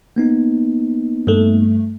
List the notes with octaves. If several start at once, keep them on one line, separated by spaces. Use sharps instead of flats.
A#3 B3 D#4
G2 A3